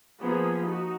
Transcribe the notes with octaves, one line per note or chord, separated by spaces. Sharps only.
F3 A#3 B3 G#4 B5
D#4 F#4